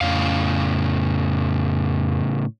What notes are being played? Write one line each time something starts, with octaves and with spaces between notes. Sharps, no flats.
F2 A2 C#3 F5